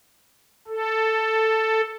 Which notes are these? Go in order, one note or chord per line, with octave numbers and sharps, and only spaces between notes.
A4